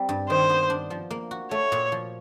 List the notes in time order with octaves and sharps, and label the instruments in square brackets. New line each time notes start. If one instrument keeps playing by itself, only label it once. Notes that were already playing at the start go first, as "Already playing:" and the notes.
Already playing: [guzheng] G3 C4
G2
[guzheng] D#3 [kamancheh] C5
[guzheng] B3
D4
F3
A#3
F#4
[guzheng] A3 [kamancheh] C#5
[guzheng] A#2
F3